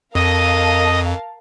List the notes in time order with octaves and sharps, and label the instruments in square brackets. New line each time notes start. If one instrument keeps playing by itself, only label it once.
[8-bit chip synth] F2 [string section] A#4 F5 A5 [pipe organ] D#5 D#6